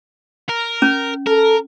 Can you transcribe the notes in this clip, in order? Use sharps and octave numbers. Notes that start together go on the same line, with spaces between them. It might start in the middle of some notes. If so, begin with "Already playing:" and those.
A#4
C#4
A4 A#4